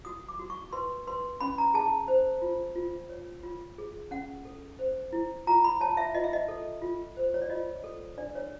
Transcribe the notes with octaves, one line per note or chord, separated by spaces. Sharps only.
F#4 D#6
D6
F#4
C#6
B4 C6
B4 C6
C#4 B5
A#5
G#4 A5
C5
F4
F4
C#5
F4
G#4
C#4 F#5
A4
C5
E4
F4 A#5
B5
C#5 A5
E5
F4 D#5
E5
D#5
A4
F4
C5
C#5
D5
F4 D#5
A4
D4 D5
C#5